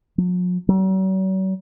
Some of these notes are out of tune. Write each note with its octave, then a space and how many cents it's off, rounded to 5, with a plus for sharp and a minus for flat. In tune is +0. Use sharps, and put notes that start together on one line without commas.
F#3 -45
F#3 +45